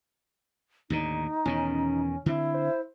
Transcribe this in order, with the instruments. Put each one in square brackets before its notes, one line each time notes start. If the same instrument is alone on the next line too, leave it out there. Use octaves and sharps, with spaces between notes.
[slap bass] D#2 A2 D3 [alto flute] D#4
[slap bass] E2 B2 D#3 [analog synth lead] C#4
[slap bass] D3 C4 [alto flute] E4
[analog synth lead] C5